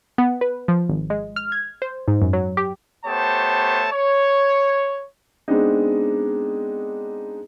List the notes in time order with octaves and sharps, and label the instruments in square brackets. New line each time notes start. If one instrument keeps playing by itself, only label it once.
[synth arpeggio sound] B3
B4
F3
G#1
G#3
F6
G#6
C5
G#2
F#2
F#3
G4
[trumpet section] A3 B3 G4 C5 C#5 A5
C#5
[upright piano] G#3 B3 C4 D4 D#4